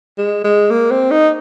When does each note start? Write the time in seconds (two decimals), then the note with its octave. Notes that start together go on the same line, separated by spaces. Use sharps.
0.18 G#3
0.44 G#3
0.71 A#3
0.91 C4
1.11 D#4